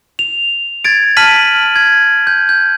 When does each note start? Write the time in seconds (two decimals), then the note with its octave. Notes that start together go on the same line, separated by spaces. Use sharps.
0.19 F7
0.85 G#6 A6 D7
1.17 A5 F6 B6 D#7 F#7
1.76 G#6
2.27 G6
2.49 G6